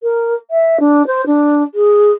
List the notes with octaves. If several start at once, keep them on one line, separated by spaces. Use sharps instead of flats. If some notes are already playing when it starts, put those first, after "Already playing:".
A#4
E5
D4
C5
D4
G#4